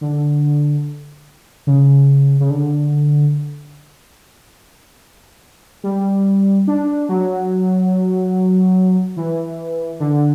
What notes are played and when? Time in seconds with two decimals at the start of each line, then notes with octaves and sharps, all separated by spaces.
0.01 D3
1.67 C#3
2.40 C#3
2.50 D3
5.84 G3
6.67 D4
7.09 F#3
9.17 E3
10.00 D3